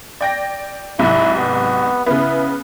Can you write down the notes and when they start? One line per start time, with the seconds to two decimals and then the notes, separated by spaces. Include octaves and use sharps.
0.21 D5 G5 A#6
0.99 C2 G#2 F#3 E4
1.38 B3
2.06 C#3 B3 E4